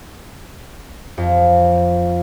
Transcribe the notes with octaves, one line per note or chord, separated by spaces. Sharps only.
F2